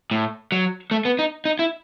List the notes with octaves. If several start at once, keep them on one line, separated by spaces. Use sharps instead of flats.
A2
F#3
A3
B3
D#4
D#4
E4